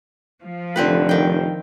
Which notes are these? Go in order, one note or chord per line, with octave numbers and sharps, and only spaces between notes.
F3
F1 D3 C4 B4
D#3 G5